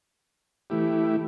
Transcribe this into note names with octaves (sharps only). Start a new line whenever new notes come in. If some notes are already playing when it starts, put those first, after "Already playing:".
E3 A3 E4 G4